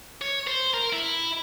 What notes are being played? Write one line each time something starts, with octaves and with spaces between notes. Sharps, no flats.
C#5
C5
A#4
E4